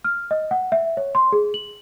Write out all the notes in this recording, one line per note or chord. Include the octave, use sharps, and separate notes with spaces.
F6
D#5
F#5
E5
C#5
C6
G#4
F#7